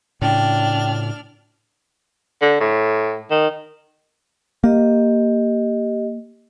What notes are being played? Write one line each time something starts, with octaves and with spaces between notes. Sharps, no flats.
A2 C#3 D4 G5 F6
D3
A2
D#3
A#3 G4 D#5